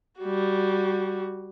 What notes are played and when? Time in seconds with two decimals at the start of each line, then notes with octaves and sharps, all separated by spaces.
0.20 G3 F#4